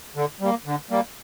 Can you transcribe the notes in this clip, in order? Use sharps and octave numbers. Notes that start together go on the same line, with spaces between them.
D3
G3 A#3
D3
G3 A#3